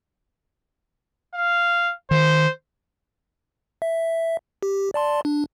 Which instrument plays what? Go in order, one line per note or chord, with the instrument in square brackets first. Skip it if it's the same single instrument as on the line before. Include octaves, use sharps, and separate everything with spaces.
[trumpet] F5
[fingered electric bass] D#3 [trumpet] C5
[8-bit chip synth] E5
G4
D5 A5 C6
D4